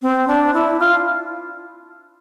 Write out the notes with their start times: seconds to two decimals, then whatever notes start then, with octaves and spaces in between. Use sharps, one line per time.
0.02 C4
0.28 D4
0.54 E4
0.80 F4